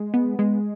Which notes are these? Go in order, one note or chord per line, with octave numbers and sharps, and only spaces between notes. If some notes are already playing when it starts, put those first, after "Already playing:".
Already playing: G#3
B3
G#3